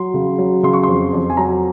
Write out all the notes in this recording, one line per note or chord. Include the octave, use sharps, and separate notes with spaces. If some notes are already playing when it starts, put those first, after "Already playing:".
Already playing: F#3 C6
C#3
F#3
C#3 C6
C#6
F2 C6
F2
G#5
F#3 A#5